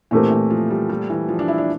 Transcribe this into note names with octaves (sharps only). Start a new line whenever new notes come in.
A#2 E3 A3 C4 G4 A#4
E3
F3
G3
G3
E3
F3
D4
E4
D4